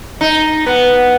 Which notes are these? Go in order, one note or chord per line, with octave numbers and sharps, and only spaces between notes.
D#4
B3